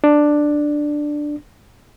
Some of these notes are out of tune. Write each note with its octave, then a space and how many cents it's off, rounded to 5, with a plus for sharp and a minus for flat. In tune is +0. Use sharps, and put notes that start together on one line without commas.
D4 +10